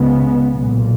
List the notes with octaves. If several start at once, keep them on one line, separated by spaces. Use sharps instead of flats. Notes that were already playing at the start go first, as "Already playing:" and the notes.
Already playing: C#2 C#3 G#3 B3
B1 A#2